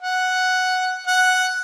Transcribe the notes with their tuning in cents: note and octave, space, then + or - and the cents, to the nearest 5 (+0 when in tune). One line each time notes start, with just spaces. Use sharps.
F#5 +0
F#5 +0